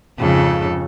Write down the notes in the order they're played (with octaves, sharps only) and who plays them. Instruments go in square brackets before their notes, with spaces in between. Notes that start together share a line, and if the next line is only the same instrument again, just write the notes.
[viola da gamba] F2 G#2 A4 [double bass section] C#3